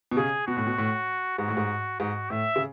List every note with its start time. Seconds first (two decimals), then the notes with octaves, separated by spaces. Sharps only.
0.11 B2
0.17 C#3 G#4
0.47 B2 F#4
0.57 A2
0.67 B2
0.78 A2
1.38 G#2 F#4
1.48 A2
1.57 G#2
2.00 G#2 F#4
2.30 A2 E5
2.56 C#3